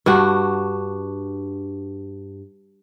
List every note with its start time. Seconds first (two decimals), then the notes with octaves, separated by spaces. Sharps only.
0.06 G2 D4 F#4